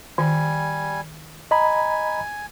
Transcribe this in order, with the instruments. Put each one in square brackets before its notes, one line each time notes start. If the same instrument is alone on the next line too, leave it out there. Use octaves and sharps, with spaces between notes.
[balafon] D#3 [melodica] G3 G#5
[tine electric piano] D#5 A#5 B5 [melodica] G#5